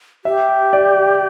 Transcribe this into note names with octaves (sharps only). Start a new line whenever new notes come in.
G4 E5
D5